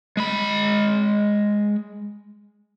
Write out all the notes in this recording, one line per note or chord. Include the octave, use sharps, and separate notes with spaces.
G#3 B5